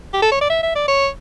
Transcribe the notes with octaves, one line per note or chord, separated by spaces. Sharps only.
G4
A4
C#5
D5
E5
E5
D5
C#5